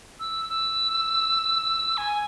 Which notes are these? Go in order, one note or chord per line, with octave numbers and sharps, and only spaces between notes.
E6
E6
G#5